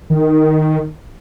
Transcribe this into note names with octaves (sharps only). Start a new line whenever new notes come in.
D#3